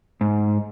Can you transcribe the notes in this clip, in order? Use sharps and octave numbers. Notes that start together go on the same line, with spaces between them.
G#2